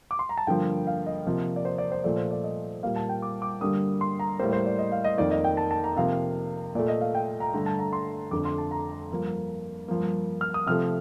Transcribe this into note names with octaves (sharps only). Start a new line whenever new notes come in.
D6
C6
A#5
A5
G2 D3 F3 A#3 G5
F5
D#5
C3 F3 A#3
D5
C5
D5
C5
A#2 F3 A3 D5
C5
D5
D#5
A#2 G3 A#3 F5
A5
G5
D6
D6
G2 D3 G3 A#3 D#6
C6
A#5
A2 G3 A#3 C5
C5
D5
D#5
F5
D#5
F2 D#3 A#3 D5
D#5
G5
A5
A5
A#5
C3 F3 A#3 F5
A#2 A3 D5
D#5
F5
G5
A#5
G2 D3 A3
A5
A#5
C6
F2 D3 A3 D6
C6
A5
A#5
G2 F3 A#3
G2 F3 A#3
F6
D#6
C3 F3 A3 F6